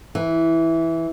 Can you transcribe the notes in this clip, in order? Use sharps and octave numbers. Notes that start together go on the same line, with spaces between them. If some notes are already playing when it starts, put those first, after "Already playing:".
E3